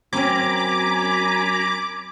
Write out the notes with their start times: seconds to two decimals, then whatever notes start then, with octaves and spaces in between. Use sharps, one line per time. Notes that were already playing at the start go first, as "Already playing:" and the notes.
0.13 F#2 C4 C#4 G#5 A#5 B5 D6